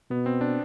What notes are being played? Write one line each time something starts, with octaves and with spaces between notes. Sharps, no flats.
B2 B3
C4
D4